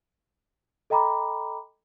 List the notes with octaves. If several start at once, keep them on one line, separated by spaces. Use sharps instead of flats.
A4 D#5 G5 A#5 B5 D6